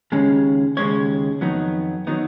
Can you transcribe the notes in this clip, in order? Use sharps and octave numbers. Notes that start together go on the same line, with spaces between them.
D#2 C#3 G#3 C#4
D#2 C#3 G#3 C#4 C#5
F2 D#3 F#3 B3 D#4
D#3 F#3 B3 D#4